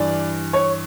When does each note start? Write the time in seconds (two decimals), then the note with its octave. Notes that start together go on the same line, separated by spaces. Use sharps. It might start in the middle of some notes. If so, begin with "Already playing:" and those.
Already playing: G2 E3 D5
0.53 C#5